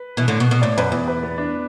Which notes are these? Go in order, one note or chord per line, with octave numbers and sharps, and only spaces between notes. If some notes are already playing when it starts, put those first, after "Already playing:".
Already playing: B4
B2 E3
A2 D3
B2
B2
A2 D5
F#2 B4
E2
B4
B3
D4